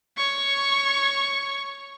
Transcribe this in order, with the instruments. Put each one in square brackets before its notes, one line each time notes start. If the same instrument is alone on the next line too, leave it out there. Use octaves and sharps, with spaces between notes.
[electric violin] C#5 C#6